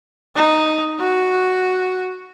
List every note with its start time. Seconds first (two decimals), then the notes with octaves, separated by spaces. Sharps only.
0.36 D#4
1.00 F#4